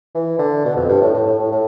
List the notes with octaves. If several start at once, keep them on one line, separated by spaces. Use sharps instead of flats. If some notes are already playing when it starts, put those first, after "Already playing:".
E3
D3
B2
F2
G2
A2
A2
A2
A2
A2